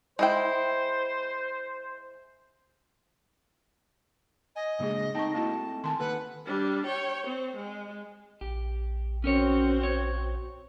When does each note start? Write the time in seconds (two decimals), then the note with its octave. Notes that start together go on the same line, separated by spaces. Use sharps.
0.19 G#3 E4 C5 G5
4.56 D#5 G#5
4.80 C#3 G#3 A#3 D4 G#4
5.15 A3 C4 D#4 G5 A5 C#6
5.34 A#3 E4 F#4 A5
5.84 D#3 G#5 A5 C6
6.00 D#3 A#3 A4 B4 F#5
6.47 G3 D4
6.86 C#5 G5
7.27 C4
7.57 G#3
8.41 A#1 G4
9.24 C4 C#4 F#4 A#4 C#5
9.83 C#5